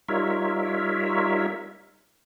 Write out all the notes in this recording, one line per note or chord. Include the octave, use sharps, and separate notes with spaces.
G3 D#4 F4 A#4 C#5 E5